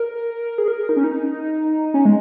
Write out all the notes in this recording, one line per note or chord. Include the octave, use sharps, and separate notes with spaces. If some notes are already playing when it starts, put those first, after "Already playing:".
Already playing: A#4
G#4
A#4
D#4
C#4
D#4
C#4
G#3